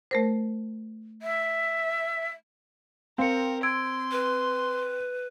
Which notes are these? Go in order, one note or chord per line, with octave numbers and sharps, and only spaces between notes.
A3 A#4 C5
E5
C4 A#4 F5 G5 C#7
C6 E6 G#6 D7
B4